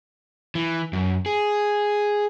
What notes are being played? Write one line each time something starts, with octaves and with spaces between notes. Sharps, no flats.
E3
F#2
G#4